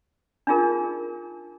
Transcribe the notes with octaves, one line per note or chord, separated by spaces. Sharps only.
D4 D#4 F4 G#4 A#4